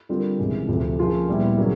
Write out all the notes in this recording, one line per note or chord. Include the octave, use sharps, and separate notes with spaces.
D3 G3 C4 F4 A#4
C#2 C3 E3
D2 C3 F3 A3
F3 A#3 C#4 F4 G#4
A#2 G3 B3 E4
C#3 F#3 A#3